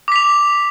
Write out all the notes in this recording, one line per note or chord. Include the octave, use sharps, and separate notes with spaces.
D6 B6 F7